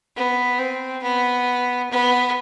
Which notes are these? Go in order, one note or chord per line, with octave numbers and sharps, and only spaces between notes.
B3
C4
B3
B3